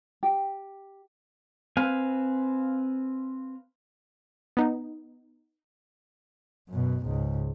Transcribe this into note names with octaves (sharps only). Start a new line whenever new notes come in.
G4
C4 B4 F5 G#5
B3 D#4
F#2 B2
C#2 G#2